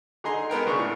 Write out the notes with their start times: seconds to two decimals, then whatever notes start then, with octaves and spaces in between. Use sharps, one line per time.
0.24 D3 D#4 G#4 A#5 C6
0.50 G#3 B3 A#4 G5
0.67 C#3 B3 D4 C#6
0.79 A2